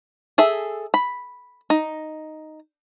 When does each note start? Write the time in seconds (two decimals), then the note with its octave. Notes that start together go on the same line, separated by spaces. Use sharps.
0.38 G#4 A4 E5
0.94 B5
1.70 D#4